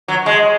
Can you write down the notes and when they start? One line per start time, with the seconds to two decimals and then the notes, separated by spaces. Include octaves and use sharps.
0.08 F#3
0.26 G#3